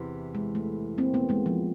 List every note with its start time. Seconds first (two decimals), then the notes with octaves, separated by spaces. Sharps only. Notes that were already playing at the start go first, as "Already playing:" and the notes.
Already playing: E2 C3 E3
0.35 G#3
0.55 A3
0.98 A#3 C4
1.14 A3 B3
1.29 G#3 A#3
1.46 F3